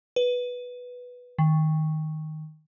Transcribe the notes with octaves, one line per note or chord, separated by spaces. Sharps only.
B4
D#3